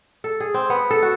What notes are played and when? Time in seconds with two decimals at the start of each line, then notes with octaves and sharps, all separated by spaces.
0.24 A4
0.40 G#4
0.54 C4
0.70 B3
0.90 A4
1.02 F#4